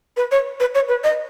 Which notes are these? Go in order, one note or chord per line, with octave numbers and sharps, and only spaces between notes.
B4
C#5
B4
C#5
B4
D#5